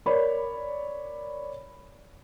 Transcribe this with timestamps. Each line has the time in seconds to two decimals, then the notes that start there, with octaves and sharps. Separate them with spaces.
0.06 A#4 C#5 D5 B5